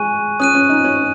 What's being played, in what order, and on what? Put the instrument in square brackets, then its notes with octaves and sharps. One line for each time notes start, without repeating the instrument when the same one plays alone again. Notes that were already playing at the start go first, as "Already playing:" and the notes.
Already playing: [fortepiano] G#3 [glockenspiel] G#5 C#6 F#6 D#7
[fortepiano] C#4 [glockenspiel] D#6 F#6 D#7
[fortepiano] C#4
D#4
C#4